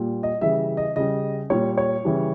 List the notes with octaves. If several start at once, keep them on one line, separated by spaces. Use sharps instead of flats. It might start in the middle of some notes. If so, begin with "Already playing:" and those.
Already playing: A#2 G3
D#5
C#3 E3 G3 E5
D#5
C#3 G3 D#5
A#2 G3 C#5
C#5
C#3 E3 G3